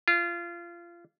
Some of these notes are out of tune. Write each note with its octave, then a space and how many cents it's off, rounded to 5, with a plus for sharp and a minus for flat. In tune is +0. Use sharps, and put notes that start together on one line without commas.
F4 -25